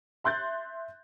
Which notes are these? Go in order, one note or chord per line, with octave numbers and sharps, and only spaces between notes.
E5 C6 F#6 G6 A6